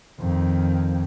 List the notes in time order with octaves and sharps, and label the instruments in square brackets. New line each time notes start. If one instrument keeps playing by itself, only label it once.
[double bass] F2 D#3